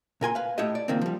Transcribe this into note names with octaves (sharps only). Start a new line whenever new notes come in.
A#2 A#4 G#5 C6
B4 F5
A2 E4 G4 D#5
D5
C#2 D#3 A#3 C4
F3 G3